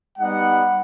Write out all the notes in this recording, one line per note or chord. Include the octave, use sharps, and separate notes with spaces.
G3 B3 D#4 F#5